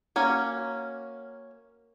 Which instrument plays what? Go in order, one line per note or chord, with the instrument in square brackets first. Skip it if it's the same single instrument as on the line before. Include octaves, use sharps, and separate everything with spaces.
[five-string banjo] A#3 C#4 F#4